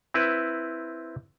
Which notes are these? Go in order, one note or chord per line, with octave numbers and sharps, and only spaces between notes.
C4 E4 B4